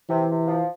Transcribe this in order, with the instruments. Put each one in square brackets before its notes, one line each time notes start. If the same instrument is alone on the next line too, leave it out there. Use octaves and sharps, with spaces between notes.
[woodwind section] C3 [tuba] E3
[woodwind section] C3
F3